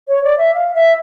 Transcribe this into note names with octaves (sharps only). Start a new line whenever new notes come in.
C#5
D5
E5
F5
E5